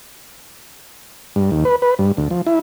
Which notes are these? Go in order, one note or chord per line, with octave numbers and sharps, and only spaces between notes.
G2
D#2
B4
B4
G2
D2
F3
E4